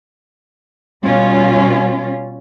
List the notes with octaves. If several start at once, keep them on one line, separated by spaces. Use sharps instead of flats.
B2 G3 C#4 F4